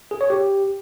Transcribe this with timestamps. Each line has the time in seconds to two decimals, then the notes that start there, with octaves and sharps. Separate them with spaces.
0.11 G#4
0.21 C#5
0.30 G4